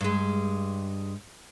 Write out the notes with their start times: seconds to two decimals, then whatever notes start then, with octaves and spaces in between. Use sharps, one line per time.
0.01 G2 G#3